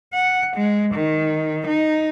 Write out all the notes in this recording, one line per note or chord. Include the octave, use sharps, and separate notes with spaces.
F#5
G#3
D#3
D#4